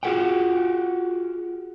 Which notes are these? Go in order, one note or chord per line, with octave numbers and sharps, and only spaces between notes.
F4 F#4 G#4 A4 F#5 G5